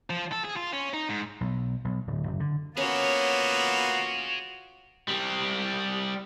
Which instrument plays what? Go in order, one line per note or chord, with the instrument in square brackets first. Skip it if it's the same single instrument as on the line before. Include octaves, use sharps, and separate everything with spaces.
[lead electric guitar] F3
A4
G#4
F4
C#4
D#4
G#2
[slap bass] B1
B1
D1
F#1
D3
[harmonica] A#3 B3 [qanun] C#4 [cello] F4 F#4 [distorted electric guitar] G#4 C#5
[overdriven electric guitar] G3 C4